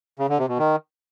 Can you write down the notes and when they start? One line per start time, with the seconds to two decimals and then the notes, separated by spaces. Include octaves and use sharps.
0.19 C#3
0.29 D3
0.39 C3
0.49 B2
0.59 D#3